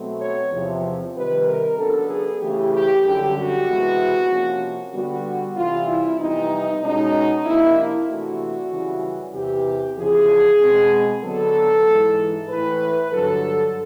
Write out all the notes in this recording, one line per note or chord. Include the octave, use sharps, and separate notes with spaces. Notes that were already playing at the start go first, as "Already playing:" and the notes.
Already playing: B2 F#3 A3 C4
C#5
E2 C3 F3
C3 D#3 G3 B4
A#4
C#3 F#3 B3 D4 A4
G#4
C#3 E3 A3 G4
G4
F#2 D3 G3 G4
F#4
C3 E3 G#3 B3
C3 F3 A#3 C#4
D3 G3 B3 F#4
C3 E3 G3 F4
E4
F2 C3 E3 G3 B3 D#4
B2 G#3 C#4 D#4
C3 F3 A#3 D4 E4
C3 E3 A3 D4 F#4
F#2 C#3 E3 G3
E2 C3 E3 G4
E2 C#3 F3 G#4
B2 G#3 C4
D3 F#3 B3 A4
G#2 E3 G#3
A2 E3 A3 B4
G2 D3 F#3 A4